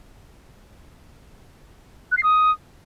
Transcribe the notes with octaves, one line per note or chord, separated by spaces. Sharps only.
F#6
C7
D#6